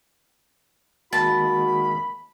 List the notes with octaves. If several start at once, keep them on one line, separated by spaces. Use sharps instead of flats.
D#3 G#3 A#3 F#4 A5 B5